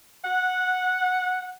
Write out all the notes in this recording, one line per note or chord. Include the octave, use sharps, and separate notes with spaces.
F#5